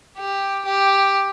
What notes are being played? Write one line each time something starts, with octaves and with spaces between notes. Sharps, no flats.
G4
G4